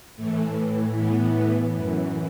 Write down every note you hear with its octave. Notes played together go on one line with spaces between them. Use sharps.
A2 E3 A3
B3
F#2 E3